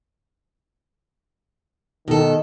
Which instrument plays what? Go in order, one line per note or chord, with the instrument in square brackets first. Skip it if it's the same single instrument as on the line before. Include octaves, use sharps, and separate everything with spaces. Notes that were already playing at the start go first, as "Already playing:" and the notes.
[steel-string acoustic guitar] B2 A4 [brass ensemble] D#3